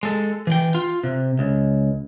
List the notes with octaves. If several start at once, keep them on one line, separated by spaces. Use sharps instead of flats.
G#3 A4
E3 G5
F4
C3
C#2